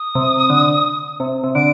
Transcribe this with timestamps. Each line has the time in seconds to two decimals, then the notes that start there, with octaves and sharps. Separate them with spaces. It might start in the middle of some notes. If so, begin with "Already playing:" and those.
Already playing: D#6
0.15 C3
0.50 D3
1.20 C3
1.44 C3
1.55 D3 D7